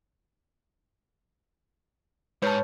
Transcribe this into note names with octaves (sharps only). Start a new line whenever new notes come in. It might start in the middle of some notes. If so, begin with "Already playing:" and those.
G#2 B4 C#5 A5 F6 G6